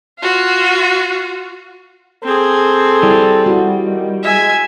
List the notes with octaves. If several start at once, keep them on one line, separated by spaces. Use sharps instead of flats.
F4 F#4
C4 G#4 A4
G3 E4
E4 F#4
D#3
G#3 E5 G#5